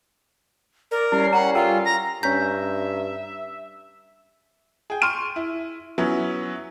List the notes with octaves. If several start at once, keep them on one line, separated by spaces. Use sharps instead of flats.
A#4 D5
G3 C#4 E4 C7
F#5 A#5
F4 A4 A#4 G5
A#5
G2 C#4 E5 A#5 G6 B6
G#4 G5
C6 C#6 F6 D#7
E4
F#3 B3 C#4 E4